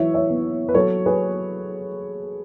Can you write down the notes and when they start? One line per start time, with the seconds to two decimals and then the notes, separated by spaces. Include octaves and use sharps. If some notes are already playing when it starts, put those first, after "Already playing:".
Already playing: E3 F#3 C#5 E5
0.14 C#5 E5
0.30 B3
0.69 B4
0.75 F#3 A4 C#5
1.06 G#4 B4